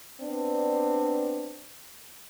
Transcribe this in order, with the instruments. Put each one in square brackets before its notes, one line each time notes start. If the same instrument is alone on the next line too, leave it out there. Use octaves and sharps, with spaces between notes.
[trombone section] B3 C4 D4